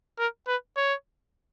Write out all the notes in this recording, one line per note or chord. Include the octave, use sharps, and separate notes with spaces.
A#4
B4
C#5